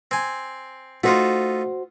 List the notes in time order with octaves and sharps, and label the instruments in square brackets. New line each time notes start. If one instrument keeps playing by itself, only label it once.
[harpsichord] C4 G#5
[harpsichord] A3 D#4 F4 [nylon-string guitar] F#4 C5